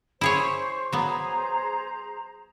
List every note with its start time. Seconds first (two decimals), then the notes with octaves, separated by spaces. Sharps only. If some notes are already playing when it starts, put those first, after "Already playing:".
0.21 E4 G#4 C5 C#5 C#6
0.92 F#3 B3 G#4 C5 A#5